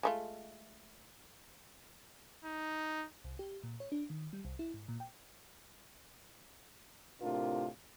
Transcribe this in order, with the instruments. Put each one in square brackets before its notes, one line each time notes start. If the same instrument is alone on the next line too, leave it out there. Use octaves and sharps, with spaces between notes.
[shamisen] G#3 A3 F4
[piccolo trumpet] D#4
[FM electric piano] C2
G4
A#2
C#5
D4
D#3
G3
C2
E4
G#2
A#2
G5
[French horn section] A2 C3 D4 F4 A#4